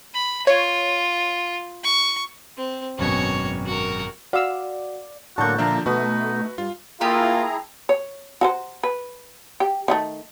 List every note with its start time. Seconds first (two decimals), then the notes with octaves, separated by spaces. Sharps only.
0.14 B5
0.47 F4 C#5
1.84 C#6
2.57 C4
2.98 G#1 F#2 B2 F#4 C#5
3.66 F#4 A#4
4.33 F#4 D5 F5 F#5 E6
5.38 A2 D3 F#3 A#3 F#4 A5 G6
5.58 A#2 D3 F3 D4 E5 F5 A5 A#5
5.86 B2 A3 D#4 F#4 B4
6.58 G2 F4
7.01 A3 A#3 E4 F4 G4 G#4 A#5 D#6
7.89 C#5
8.41 F#4 A4 C5
8.83 B4
9.60 G4
9.88 D#3 G3 A3